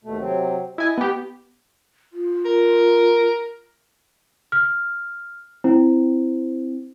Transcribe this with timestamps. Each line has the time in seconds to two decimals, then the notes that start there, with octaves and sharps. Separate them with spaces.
0.04 D#2 B2 A3
0.20 C3 F#3 C4
0.78 E4 D#5 G#5
0.98 B3 G4
2.12 F4
2.45 A#4
4.52 F6
5.64 C4 E4